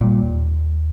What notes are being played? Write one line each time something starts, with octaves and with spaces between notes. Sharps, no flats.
A#2 G3
D#2